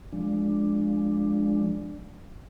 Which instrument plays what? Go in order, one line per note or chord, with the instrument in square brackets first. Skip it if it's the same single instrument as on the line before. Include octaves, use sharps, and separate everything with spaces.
[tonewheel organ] F3 G#3 D4